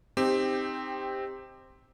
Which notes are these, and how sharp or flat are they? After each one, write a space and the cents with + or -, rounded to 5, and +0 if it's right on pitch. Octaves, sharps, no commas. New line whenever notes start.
C4 +0 D#4 +0 G4 +15